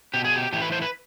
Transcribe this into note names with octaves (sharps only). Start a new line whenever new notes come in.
B2 G4
G#4
G4
A2 E3 G4
B4
C5
B4